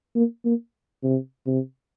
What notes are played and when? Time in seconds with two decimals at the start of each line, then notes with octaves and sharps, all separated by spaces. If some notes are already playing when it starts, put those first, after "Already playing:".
0.15 A#3
0.45 A#3
1.03 C3
1.46 C3